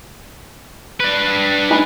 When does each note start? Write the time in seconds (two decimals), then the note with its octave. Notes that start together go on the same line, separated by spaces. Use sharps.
1.00 D4 B4
1.70 D#4 G#5 B5